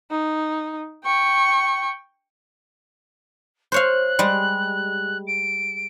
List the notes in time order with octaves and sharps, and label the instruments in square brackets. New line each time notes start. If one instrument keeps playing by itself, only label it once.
[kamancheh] D#4
G5 C#6
[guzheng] C5 C#5 F5 [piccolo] F#6
[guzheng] G3 G#3
[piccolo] D7